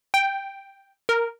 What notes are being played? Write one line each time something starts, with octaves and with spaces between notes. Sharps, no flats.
G5
A#4